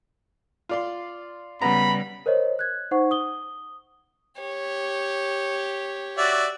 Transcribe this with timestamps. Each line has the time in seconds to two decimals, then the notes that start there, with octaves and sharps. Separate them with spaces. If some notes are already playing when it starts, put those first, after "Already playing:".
0.69 F4 D5 C6
1.62 C#3 G3 B3 A#5 B5
2.26 A#4 C5 C#5 D#5
2.59 F#6 G#6
2.91 D#4 C5 F#5 C#6
3.11 D#6 G7
4.41 G4 C#5
6.18 F#4 D5 E5